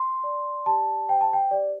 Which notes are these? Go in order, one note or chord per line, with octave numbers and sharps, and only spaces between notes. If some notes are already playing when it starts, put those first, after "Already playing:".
Already playing: C6
D5
G4 A5
C5 G5
A5
G5
G4 D5